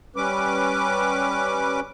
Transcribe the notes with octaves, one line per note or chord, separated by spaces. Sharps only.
G3 C#4 B4 D6